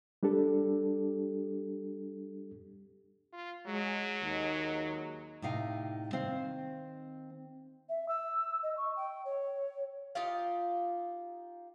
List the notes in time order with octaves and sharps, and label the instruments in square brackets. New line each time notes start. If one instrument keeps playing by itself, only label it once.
[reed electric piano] G3 D4 G4 A4
[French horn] F4
[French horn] F#3 [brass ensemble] G#3
[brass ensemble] D#2 G#3 D#4
[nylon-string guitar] A2 C3 D#4 F5 G5
D#3 C4 C5 F5
[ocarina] E5
E6
D#5
C#6
G5
C#5
[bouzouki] D#4 F4 G4 F5